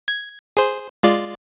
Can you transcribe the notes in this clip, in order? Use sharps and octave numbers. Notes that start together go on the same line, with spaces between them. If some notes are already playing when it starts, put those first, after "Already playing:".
G#6
G#4 C5
G#3 F4 D5